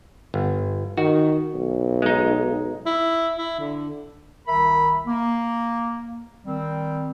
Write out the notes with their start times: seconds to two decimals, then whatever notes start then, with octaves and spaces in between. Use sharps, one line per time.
0.34 G1
0.98 D#3 F#4
1.54 B1
2.02 G#3 D#4
2.86 E4
3.38 E4
3.60 D3
4.47 C2 D#3 A#4 E5 B5
5.06 A#3
6.45 D#3 G3 C4